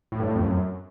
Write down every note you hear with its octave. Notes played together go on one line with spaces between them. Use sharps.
A2
G2
A2
F2
F#2